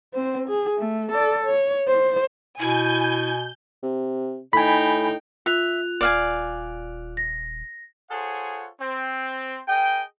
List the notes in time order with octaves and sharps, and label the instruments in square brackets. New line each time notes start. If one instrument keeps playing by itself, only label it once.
[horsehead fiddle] C4 C5
G#4
A3
A4 D5
C#5
C5
[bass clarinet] B2 [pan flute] E4 [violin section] G#5 [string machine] G6
[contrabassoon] C3
[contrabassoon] A2 [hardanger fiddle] D#4 G5 [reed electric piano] G#5 B5
[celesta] F4 F#6 F7 [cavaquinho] E5
[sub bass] D#1 [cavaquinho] D5 F5 G#5
[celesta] A#6
[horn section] F4 G#4 A4 C5 C#5 F#5
C4
G#4 A#4 D#5 G5